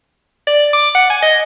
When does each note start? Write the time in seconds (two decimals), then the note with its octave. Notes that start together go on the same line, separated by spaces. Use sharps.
0.47 D5
0.73 D6
0.95 F#5
1.10 G#5
1.23 D#5